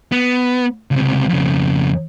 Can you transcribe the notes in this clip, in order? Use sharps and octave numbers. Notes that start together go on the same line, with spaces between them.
B3
C#2 C3
F2 C#3